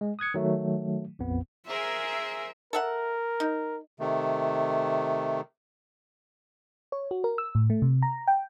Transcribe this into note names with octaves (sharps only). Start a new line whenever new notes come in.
G#3
D#6 F#6 G#6 C#7
D#3 F#3 A3
A#1 F2 B3
G#4 A#4 C5 E5
A4 A#4 E5 F#5
D#4
C3 D#3 A3
C#5
F#4
A#4
E6
A2
A3
C3
A#5
G5